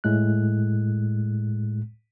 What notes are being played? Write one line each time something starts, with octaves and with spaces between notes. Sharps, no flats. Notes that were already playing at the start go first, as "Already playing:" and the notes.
A2 G#3 F#6